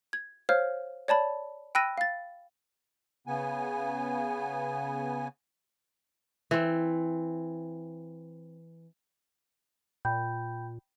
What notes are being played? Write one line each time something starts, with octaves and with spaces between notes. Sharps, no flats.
G#6
C5 C#5 F5 F6
C#5 D5 A5 B5
G5 B5 E6 F#6 A#6 D#7
F5 A6
C#3 B3 G#5
E3 C4
A#2 G5 B5 G6